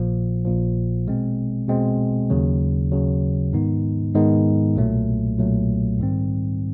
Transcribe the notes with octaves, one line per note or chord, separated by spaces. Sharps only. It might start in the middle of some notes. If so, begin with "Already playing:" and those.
Already playing: A#1 A#2 F3
A#1 A#2 F3
B2 G#3 C4
B2 G#3 C4
D#2 C#3 F#3
D#2 C#3 F#3
G#2 D#3 G#3 B3 D#4
G#2 D#3 G#3 B3 D#4
B1 A#2 F#3 A3
B1 A#2 F#3 A3
G#2 D#3 G3 C4